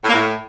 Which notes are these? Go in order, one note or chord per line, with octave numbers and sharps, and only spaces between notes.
A2
A#3
A2